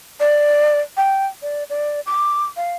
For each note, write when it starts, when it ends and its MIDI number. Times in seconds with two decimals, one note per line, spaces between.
0.20 0.80 74
0.97 1.27 79
1.42 1.64 74
1.70 2.01 74
2.06 2.46 86
2.56 2.76 77